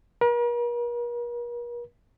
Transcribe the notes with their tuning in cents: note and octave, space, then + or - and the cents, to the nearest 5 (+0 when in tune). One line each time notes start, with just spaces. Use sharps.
A#4 +45